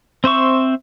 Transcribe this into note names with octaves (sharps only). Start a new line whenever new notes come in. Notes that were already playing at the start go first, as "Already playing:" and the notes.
C4 C5 E5 C#6